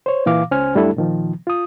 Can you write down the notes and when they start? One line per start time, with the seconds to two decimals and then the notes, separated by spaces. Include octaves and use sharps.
0.06 C5 C#5
0.26 A#2 E3 F5 D6
0.51 C#2 C#4 C5 G#5 F6
0.75 F#2 G3 A3 D4 E4 A4
0.97 A#2 D#3 F3
1.47 F4 D#6